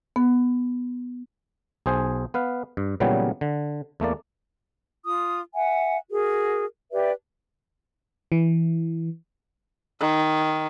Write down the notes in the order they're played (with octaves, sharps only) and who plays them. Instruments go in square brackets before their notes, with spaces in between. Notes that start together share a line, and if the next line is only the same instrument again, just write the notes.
[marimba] B3
[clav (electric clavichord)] B1 G#4 C5 G#5
B3 B4 F5
G2
A#2 C#3 E3 F#3 G3 B3
D3
E2 A3 A#3 D5
[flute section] F4 D#6
E5 F#5 G#5
F#4 G#4 A#4
G4 B4 D5 E5
[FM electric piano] E3
[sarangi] D#3